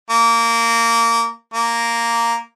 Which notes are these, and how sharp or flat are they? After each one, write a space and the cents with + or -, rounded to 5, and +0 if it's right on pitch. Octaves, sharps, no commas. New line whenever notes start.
A#3 -15
A#3 -5